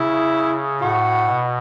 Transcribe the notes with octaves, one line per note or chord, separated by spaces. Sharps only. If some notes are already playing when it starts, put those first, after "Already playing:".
Already playing: C#3 E4
A2 F#4
B2